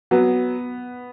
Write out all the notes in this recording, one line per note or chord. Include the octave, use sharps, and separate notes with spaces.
F#3 B3